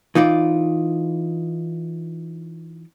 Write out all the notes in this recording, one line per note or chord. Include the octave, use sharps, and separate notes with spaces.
E3 D#4 F4 D5